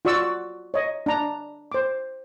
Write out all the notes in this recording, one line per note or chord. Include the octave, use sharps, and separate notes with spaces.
F4 F#4 D5 C#6 E6
C#5 D#5
D4 A#5
C5 D6